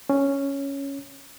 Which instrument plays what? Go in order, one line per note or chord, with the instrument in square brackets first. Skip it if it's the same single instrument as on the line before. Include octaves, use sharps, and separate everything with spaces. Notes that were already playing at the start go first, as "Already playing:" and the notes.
[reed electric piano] C#4